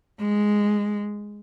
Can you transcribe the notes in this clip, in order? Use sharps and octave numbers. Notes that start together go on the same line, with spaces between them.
G#3